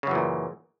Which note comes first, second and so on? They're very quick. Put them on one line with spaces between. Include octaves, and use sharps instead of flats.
C#3 F#2 E3 A#2